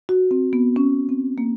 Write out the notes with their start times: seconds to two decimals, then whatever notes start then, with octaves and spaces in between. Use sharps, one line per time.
0.09 F#4
0.31 C4
0.53 B3
0.76 C#4
1.09 C4
1.38 A#3